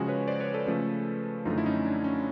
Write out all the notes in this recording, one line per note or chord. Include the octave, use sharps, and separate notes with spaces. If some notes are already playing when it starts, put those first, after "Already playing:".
Already playing: C#3 F3 G#3 C#4 F#4 G#4
B4 C#5
C5 D5
B4 C#5
A4 B4
C#3 F3 A3 C#4
F#2 D3 F3 A3 D#4 F4
E4
C#4 D#4
D4
C#4